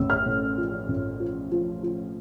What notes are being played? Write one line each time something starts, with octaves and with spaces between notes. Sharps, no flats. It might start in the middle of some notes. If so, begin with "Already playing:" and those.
Already playing: A1 A2 E6
F6
A2
F3
A1
F3
F3
F3